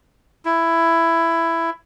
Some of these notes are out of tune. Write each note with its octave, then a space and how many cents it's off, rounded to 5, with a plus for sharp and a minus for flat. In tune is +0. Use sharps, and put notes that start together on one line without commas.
E4 +10